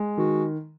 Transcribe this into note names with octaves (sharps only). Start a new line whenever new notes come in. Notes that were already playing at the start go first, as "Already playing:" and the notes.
Already playing: G#3
D#3 F#4